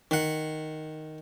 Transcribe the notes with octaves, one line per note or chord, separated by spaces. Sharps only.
D#3 F#5